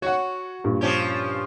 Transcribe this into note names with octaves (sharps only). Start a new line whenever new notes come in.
F#4 C#5 F#5
G2 A#2
F3 C#4 G4